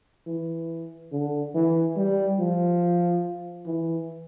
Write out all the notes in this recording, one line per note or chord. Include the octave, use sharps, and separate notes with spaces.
E3
D3
E3
G3
F3
E3